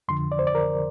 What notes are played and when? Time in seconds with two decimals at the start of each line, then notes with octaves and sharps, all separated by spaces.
0.08 F2 D3 F3 C6
0.32 D5
0.39 C5
0.47 D5
0.55 A#4